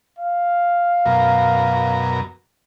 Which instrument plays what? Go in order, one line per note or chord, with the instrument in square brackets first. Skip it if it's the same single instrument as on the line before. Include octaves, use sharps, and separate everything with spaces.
[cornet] F5
[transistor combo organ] F#2 B2 A#4